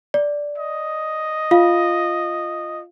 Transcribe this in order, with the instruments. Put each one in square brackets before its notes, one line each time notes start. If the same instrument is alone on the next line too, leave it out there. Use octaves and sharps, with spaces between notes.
[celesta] D5
[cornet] D#5
[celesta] F4 F5